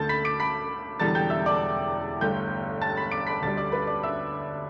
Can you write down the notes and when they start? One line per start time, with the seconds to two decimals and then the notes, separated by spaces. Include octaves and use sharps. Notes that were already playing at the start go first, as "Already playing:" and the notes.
Already playing: D2 D3 A3 A5 G6 A6
0.09 B5 B6
0.25 D6 D7
0.40 B5 B6
1.00 E1 E2 D3 G3 A5 A6
1.15 G5 G6
1.30 E5 E6
1.46 D5 D6
2.21 G1 G2 D3 A3 G5 G6
2.81 A5 A6
2.97 B5 B6
3.12 D6 D7
3.27 B5 B6
3.42 D2 D3 G3 A5 A6
3.57 D5 D6
3.72 B4 B5
3.87 D5 D6
4.03 E5 E6